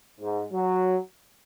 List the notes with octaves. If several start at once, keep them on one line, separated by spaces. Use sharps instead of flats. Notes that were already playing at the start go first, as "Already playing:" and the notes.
G#2
F#3